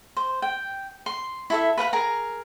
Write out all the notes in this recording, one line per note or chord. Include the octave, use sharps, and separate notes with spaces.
C5
G5
C6
E4 A4 E5
B4 F5 F#5 B5
G#4 A#4 A#5